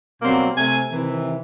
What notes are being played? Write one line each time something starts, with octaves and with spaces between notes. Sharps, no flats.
B2 F#3 G3 A#3 C4
C3 A3 G#5
C3 D#3 E3